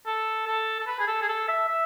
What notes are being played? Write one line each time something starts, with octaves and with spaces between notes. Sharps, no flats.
A4
A4
A4
B4
G#4
A4
G#4
A4
E5
E5